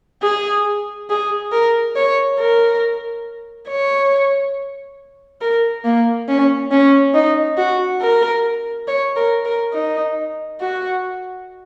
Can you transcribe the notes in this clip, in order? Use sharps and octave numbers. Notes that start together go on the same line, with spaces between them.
G#4
G#4
A#4
C#5
A#4
C#5
A#4
A#3
C#4
C#4
D#4
F#4
A#4
C#5
A#4
A#4
D#4
F#4